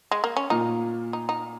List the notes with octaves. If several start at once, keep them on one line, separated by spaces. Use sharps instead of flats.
G#3
A#3
C#4
A#2 A#3 D#4 F4
D#4
D#4